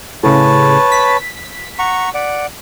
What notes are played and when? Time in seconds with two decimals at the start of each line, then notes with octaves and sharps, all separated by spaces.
0.23 A2 C#3 B4 C#5 A5
0.92 B6
1.79 F#5 A#5 C#6
2.15 D5 F#5